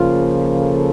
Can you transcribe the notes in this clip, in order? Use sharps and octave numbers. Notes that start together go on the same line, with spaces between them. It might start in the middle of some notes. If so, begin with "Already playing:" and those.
Already playing: C#3 F3 A#3 F4
A4